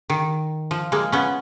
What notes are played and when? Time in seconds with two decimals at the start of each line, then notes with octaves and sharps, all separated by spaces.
0.10 D#3
0.71 F3
0.92 G#3 A#3
1.12 B3 C#4